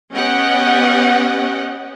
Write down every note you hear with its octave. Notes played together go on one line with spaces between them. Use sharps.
B3 C#4 G4 D#5 F#5 G5